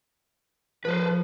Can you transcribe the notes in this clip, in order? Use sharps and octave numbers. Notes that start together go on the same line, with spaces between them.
F3 B4 C5